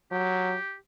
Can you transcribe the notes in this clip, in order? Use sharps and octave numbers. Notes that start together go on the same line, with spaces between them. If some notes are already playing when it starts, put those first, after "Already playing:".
F#3 G4